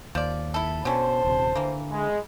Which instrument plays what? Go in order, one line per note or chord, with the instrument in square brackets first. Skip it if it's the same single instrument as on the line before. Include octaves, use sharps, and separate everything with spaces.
[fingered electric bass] D#2 [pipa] F3 D5
[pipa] E4 A4 [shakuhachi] B5
[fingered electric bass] B2 [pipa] D3 C#4 [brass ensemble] C5 [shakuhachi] A5
[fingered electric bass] D#1 C3
[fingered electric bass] D3 [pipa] E3 A#3
[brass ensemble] G#3 [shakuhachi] B5